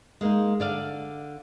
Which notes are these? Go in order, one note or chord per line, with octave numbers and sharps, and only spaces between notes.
G#3 A#3 D4 D#4
D3 D5 F5